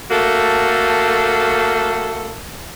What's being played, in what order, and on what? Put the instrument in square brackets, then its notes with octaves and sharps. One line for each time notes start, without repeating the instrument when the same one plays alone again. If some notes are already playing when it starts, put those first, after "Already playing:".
[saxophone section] A3 A#3 F#4 A4